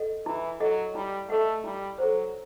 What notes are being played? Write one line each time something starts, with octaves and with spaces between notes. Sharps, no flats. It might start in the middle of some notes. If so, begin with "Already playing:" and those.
Already playing: A4 D#5 F#5
E3 E4
F#3 A4 D#5 F#5
G3 E4
A3 A4 D#5 F#5
G3 E4
F#3 A4 C5